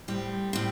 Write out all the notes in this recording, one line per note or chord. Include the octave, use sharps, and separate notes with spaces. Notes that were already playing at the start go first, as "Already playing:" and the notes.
A2 G3 C4
A2 G3 C4